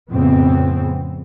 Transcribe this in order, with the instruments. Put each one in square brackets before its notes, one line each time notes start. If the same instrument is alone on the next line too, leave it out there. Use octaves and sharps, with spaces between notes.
[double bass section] F2 A2 C#3 B3 C4